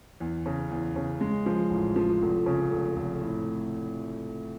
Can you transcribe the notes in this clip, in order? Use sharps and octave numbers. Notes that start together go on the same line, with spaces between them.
E2
C#3
E2
C#3
G#3
F3
A1
F3
F1
C#3
F1
F1
A2